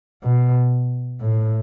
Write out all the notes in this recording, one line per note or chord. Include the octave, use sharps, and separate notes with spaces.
B2
A2